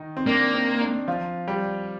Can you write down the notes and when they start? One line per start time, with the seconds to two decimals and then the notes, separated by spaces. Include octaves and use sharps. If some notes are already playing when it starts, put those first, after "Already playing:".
Already playing: D#3 D#4
0.17 C4
0.27 A#3 D4
0.54 C4
0.81 D4
1.08 F3 F4
1.47 G3 G4